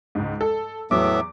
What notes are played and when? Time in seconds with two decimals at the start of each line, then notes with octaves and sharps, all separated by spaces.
0.15 C#2 G#2
0.41 A4
0.91 E2 A2 F#3 B3 E5 D6